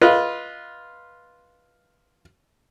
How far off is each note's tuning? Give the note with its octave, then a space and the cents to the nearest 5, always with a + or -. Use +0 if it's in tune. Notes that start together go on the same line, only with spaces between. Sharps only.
F4 +0 B4 -15 D#5 +5